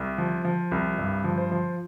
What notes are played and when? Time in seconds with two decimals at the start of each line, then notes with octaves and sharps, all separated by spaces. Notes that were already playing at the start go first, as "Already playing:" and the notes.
Already playing: C2
0.18 F3
0.45 F3
0.72 C2
0.98 G2
1.24 F3
1.38 C5
1.52 F3